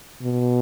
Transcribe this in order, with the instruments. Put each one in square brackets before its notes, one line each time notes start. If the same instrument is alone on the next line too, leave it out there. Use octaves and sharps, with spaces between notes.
[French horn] B2